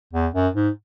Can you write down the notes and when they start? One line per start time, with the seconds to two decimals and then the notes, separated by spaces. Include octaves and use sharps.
0.13 E2
0.34 F#2
0.54 G#2